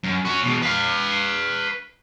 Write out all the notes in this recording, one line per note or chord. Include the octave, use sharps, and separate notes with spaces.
F#2
C#4 F#4
E2 B2
B4 F5